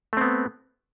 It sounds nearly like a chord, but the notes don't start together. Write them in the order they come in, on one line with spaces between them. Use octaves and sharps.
A3 C4 B3